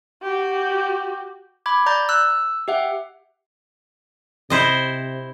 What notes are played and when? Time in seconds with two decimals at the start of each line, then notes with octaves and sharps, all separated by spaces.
0.23 F#4 G4
1.66 B5 D6 G#6
1.86 D5 A#5 G6 A6
2.09 E6 F#6
2.68 G4 E5 F#5 G5
4.50 C3 E4 C5 D#5